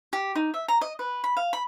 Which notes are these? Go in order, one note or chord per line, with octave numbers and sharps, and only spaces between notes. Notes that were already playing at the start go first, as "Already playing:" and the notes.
G4
D#4
E5
A#5
D#5
B4
B5
F5
B5